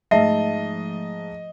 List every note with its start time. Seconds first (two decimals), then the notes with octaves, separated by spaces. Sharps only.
0.11 G#2 F3 A3 D#5 E5 A5 C7